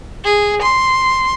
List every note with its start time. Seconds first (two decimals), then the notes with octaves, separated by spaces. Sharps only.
0.25 G#4
0.62 C6